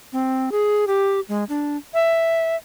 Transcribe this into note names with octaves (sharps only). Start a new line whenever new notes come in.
C4
G#4
G4
G#3
D4
E5